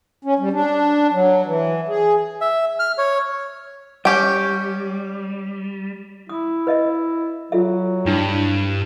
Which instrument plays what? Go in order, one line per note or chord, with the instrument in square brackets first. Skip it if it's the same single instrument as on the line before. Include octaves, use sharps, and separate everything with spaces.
[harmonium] C#4
G3
D4
F#3
E3
G#4
[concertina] E5
F6
C#5
[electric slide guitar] G3 [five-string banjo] C#4 G4 G5
[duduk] E4 [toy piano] D#6
[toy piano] B4 D#5 E5
[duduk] F#3 [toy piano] F4 A4 E5
[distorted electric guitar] G2 [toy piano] D4 E4